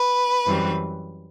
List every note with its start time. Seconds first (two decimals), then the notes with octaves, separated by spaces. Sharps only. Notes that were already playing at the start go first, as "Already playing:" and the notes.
Already playing: B4
0.46 F#2 E3 G3 C4